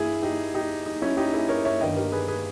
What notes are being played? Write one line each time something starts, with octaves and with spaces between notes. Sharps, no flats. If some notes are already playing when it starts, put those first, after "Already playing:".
Already playing: G1 G2 E3 E4 G#4
D#4 G4
D#4 G4
D#4
C#4 E4
D#4 G4
E4 G#4
A#4 C#5
C#5 E5
G1 G2 D#3 D#5 G5
G4 A#4
G#4 B4
G#4 B4